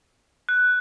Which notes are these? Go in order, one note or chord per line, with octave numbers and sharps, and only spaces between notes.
F#6